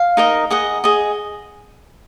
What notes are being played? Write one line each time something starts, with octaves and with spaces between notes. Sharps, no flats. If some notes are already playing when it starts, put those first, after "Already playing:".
Already playing: F5
D#4 A#4 D#5
G#4 D#5 F#5
G#4 D#5